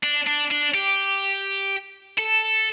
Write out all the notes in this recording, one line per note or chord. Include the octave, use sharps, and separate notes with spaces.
D4
D4
D4
G4
A4